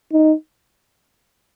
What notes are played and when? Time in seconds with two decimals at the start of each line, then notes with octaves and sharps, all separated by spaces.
0.13 D#4